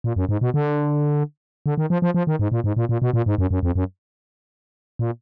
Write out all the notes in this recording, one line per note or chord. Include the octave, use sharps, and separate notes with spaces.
A#2
F#2
G#2
B2
D3
D3
D#3
F3
F3
F3
D#3
G#2
A#2
G#2
A#2
A#2
B2
A#2
G#2
F#2
F#2
F2
F#2
A#2